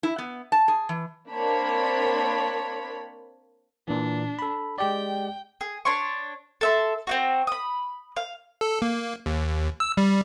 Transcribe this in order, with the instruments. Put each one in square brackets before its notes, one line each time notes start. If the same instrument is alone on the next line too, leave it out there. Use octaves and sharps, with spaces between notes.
[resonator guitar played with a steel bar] E4
B3
A5
G#4
E3
[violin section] A#3 C4 D4 C#5 B5
[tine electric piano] A#2 E3 [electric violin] D4
[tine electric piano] A4 B5
[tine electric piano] G#3 G4 D5 [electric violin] G5
[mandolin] G#4
D4 C#5 C6 C#6
A4 E5 C6
C4 D#4 F#4
B5 D#6
F5
[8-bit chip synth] A4
A#3
D#2
E6
G3